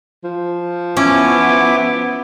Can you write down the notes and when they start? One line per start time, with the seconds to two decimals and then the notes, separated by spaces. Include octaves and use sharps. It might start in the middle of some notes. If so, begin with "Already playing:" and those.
0.24 F3
0.97 B3 C#4 E4 D6